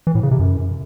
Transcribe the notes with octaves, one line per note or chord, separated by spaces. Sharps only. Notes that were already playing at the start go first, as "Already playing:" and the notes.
E3
A2
C#3
C3
F#2